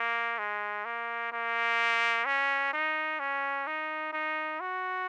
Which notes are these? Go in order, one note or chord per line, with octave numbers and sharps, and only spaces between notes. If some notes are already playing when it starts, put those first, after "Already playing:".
Already playing: A#3
G#3
A#3
A#3
C#4
D#4
C#4
D#4
D#4
F#4